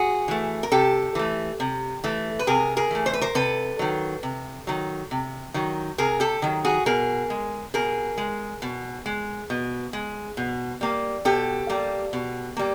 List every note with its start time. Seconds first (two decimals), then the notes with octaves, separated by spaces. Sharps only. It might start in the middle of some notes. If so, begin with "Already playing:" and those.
Already playing: F#4 G#4
0.28 E3 A3
0.63 A#4
0.72 C3 G4 A4
1.15 E3 A3
1.60 C3
2.04 E3 A3
2.39 B4
2.47 C3 G#4 A#4
2.77 G#4 A#4
2.91 E3 A3
3.06 C5
3.13 B4
3.21 A#4 C5
3.35 C3 A4 B4
3.79 D#3 F#3
4.23 C3
4.67 D#3 F#3
5.11 C3
5.54 D#3 F#3
5.98 C3 G#4 A#4
6.20 G4 A4
6.42 D#3 F#3
6.65 F#4 G#4
6.86 B2 G#4 A#4
7.30 G#3
7.74 B2 G#4 A#4
8.18 G#3
8.62 B2
9.06 G#3
9.50 B2
9.93 G#3
10.37 B2
10.81 G3 A#3
11.25 B2 G4 A4
11.69 G3 A#3
12.13 B2
12.57 G3 A#3